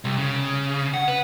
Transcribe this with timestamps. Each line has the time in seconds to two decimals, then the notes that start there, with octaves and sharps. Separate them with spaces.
0.04 C2
0.18 C#3
0.94 F#5
1.08 B4